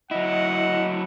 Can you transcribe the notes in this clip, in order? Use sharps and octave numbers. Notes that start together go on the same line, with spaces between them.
F#3 E4 D#5 F#5